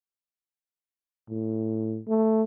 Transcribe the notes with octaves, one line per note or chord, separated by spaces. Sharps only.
A2
A3